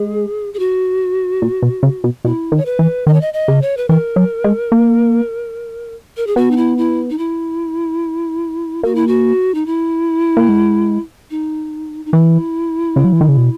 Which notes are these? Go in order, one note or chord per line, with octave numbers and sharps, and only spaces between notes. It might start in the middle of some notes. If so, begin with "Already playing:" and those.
Already playing: G#3 G#4
G#4
F#4
A#2
B2
C#3
B2
B2 E4
D#3
C#5
B4
E3
D#3 D#5
C#5
D#5
D#5
C#3
C#5
B4
E3 A#4
F#3
G#3
A#3
A#4
G#4
B3 F#4
D#4
E4
E4
D#4
E4
A#3 F#4
E4
F#4
D#4
E4
A#3
G#3
D#4
D#4
E3 E4
C#3
F#3
E3
D#3
C#3
B2